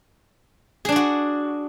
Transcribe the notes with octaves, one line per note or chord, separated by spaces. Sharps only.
D4 F#4 G#4 D5